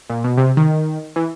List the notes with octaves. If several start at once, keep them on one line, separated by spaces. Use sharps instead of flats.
A#2
B2
C3
D#3
E3